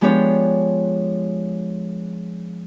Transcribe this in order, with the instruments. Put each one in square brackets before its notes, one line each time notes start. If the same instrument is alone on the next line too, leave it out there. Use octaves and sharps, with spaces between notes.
[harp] F3 G#3 B3 D4 G4 C#5